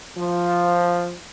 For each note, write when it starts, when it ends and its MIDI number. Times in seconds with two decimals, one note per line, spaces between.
0.18 1.14 53